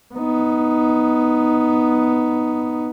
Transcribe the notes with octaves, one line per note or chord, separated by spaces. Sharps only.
B3 D#4